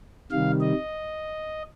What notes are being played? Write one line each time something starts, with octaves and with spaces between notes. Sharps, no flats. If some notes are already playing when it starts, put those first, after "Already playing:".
C3 D#3 G3 F5
D#5